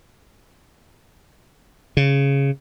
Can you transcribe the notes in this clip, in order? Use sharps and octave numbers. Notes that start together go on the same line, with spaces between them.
C#3